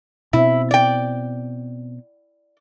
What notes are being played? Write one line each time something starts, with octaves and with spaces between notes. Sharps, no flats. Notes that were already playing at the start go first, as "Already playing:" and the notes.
B2 C4 E4
D5 G5